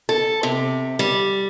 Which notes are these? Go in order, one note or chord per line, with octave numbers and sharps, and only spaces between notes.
A4
C3
G3